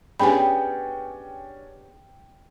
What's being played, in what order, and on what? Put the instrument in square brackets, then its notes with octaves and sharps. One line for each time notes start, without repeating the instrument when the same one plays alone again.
[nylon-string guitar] B3 G4 G#4 [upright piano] C#4 D4 [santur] G5 [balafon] G#5 B5